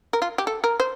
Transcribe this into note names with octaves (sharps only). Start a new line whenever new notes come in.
A#4
F4
G4
A4
A#4
C5